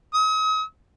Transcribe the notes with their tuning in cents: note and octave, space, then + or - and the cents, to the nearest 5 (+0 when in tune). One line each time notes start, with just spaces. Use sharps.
D#6 +40